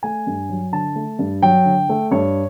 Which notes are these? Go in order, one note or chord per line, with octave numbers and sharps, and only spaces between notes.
A3 G#5
G2
F#3
D3 A5
A3
G2
F#3 G5
D3
A3
G2 C#5